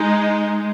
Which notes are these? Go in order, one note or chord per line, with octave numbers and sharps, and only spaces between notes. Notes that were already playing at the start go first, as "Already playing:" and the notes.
Already playing: G#3 D#4